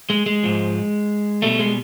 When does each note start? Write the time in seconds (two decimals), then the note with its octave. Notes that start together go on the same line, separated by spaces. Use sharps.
0.10 G#3
0.26 G#3
0.43 G#2 F3
1.42 B2 G3 A3
1.59 G#3